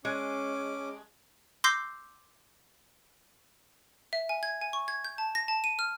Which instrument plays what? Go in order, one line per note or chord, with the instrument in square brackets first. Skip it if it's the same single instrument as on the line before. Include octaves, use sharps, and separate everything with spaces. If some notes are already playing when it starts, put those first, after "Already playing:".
[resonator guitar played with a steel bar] G#3 [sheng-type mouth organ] C#4 D6
[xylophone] C6 D6 E6 G6 A#6 C7
E5
G#5
G#6
G#5
C#6
G#6
G6
A5
A#6
A5
D#7
F6